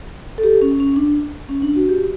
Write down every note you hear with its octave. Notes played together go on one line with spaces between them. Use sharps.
A4
G4
C#4
C#4
D4
C#4
D4
F#4
G4